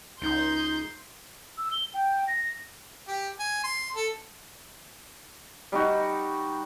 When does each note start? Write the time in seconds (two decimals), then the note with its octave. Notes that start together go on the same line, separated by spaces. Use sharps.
0.22 C#2 D#4 C6 G6
1.58 E6
1.71 G7
1.94 G5
2.28 A#6
3.07 G4
3.39 G#5
3.63 C6
3.95 A4
5.72 G3 D#4 F#4